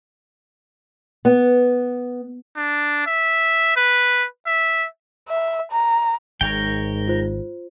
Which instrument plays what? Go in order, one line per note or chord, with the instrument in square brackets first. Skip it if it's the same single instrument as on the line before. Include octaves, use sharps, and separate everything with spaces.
[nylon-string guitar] B3
[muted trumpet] D4
E5
B4
E5
[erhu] E5
A#5
[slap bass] G#1 [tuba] G#2 [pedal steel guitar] A#4 C#5 G5
[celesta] F4 C5